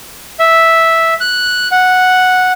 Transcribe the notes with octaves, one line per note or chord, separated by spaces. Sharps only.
E5
F#6
F#5